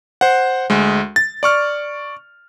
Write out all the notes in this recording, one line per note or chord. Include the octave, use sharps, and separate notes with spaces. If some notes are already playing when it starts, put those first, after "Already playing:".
C5 F#5
D2 G#3
A6
D5 C#6 F6